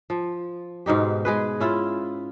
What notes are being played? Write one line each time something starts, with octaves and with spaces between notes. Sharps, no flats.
F3
G#2 B2 D#4 G4
G#3 G#4 B4
C#4 E4 F4